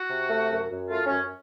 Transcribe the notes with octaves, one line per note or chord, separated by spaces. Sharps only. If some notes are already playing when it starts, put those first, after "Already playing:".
Already playing: F#4
C3
A3
F#2
F#2
A3 F4
F#2 C#4